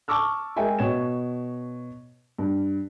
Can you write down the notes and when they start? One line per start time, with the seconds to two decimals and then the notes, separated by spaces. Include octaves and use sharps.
0.08 A5 C#6 D6 E6 F6
0.56 G#3 A#4 D#5 E5 G5 G#5
0.79 B2 C#5 G#6 E7
2.38 G2